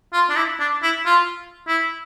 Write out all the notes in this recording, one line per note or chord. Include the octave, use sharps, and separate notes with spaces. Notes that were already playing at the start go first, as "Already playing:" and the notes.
F4
D4
E4
D4
E4
F4
E4